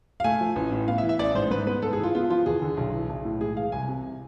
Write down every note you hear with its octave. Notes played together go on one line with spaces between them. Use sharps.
F5
A3 G#5
F3
A1
A2
B3 F5
E5
E3
E5
A1 D5
G#2 C5
G#2 B4
B3 B4
G#2 A4
G#4
E3 F4
B3 F4
F3 F4
E2 G#4
D3
B1
E3
B1
A2
G#3 G#4
E3 F5
C2 G#5
C3